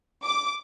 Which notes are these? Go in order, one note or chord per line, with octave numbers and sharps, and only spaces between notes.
D6